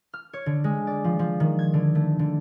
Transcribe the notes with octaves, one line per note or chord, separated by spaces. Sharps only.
F6
C#5
D3
G#3
D5
F3
F3
D#3
G#6
D3
A3
D3